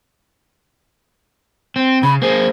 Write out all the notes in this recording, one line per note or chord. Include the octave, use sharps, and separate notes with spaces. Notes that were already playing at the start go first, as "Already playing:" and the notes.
C4
C#3 B5
A#3 G#4 C5